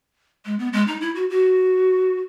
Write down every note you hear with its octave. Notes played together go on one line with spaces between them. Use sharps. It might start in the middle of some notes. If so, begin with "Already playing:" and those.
G#3
B3
G#3
D#4
E4
F#4
F#4